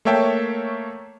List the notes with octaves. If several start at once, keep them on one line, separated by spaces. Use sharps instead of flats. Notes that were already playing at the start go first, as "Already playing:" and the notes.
A3 A#3 C#5 E5 G5 A5